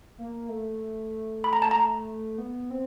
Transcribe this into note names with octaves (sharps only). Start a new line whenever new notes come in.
A#3
A3
B5
A#5
A5
A#5
B3
C4